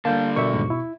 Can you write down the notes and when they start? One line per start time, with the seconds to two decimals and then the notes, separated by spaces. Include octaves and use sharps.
0.05 D3 G3 A#3 A5 G6
0.36 B2 A#4 D5 E5 C#6
0.53 D#2 G#2
0.70 E4